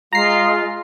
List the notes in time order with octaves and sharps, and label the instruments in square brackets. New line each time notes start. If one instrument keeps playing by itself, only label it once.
[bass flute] G#3 [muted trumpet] F4 [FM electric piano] A#5 C7